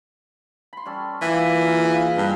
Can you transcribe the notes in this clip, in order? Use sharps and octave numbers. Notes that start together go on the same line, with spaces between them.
B5 C6
G3 C#4 A4
A#2 E3 F5 D6
C#3 D#4 A#4
G#4 F5
G2 G#3